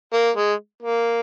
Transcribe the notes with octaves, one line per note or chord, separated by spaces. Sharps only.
A#3
G#3
A#3